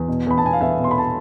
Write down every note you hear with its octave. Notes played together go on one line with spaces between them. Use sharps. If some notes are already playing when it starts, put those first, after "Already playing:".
Already playing: E2
B2
E2 B5
A5
B2 G#5
F5
E2 E5
B2
C6
B5
A5